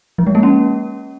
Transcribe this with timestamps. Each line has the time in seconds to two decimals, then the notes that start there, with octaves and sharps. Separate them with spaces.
0.18 F3
0.27 G#3
0.35 A#3
0.43 C#4